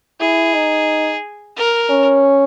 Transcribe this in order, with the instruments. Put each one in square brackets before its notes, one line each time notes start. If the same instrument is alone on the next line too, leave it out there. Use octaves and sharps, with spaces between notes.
[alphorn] E4 [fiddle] G#4
[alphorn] D#4
[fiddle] A#4
[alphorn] C#4